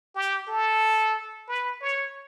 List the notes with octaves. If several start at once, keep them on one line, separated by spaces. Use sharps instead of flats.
G4
A4
B4
C#5